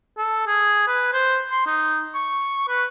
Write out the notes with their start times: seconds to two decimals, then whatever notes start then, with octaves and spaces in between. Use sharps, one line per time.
0.18 A4
0.47 G#4
0.87 B4
1.13 C5
1.51 C6
1.66 D#4
2.15 C#6
2.69 B4